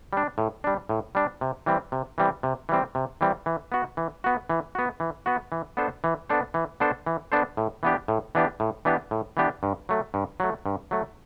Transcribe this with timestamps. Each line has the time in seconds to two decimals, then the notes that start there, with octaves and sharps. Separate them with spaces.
0.13 G3 D4
0.38 A2
0.64 G3 D4
0.89 A2
1.15 G3 D4
1.41 C3
1.66 E3 G3 C4
1.92 C3
2.18 E3 G3 C4
2.43 C3
2.69 E3 G3 C4
2.95 C3
3.21 E3 G3 C4
3.46 E3
3.72 B3 F#4
3.97 E3
4.24 B3 F#4
4.49 E3
4.75 B3 F#4
5.00 E3
5.26 B3 F#4
5.52 E3
5.77 B3 D4 A4 C5
6.04 E3
6.29 B3 D4 A4 C5
6.54 E3
6.80 B3 D4 A4 C5
7.06 E3
7.32 B3 D4 A4 C5
7.57 A2
7.83 E3 B3 D4 G4
8.08 A2
8.35 E3 B3 D4 G4
8.60 A2
8.85 E3 B3 D4 G4
9.11 A2
9.37 E3 B3 D4 G4
9.63 G2
9.89 F#3 A3
10.14 G2
10.40 F#3 A3
10.66 G2
10.91 F#3 A3